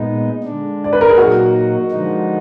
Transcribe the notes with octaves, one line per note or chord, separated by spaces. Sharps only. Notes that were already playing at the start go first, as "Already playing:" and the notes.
Already playing: A#2 G#3 B3 D#4
D3 G#3 D4
D5
B4
A#4
G#4
A#2 F#3 A#3 D#4 F#4
D3 F3 G#3 D#4